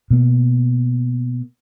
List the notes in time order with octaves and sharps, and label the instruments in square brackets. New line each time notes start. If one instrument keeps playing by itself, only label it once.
[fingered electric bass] B2 A#3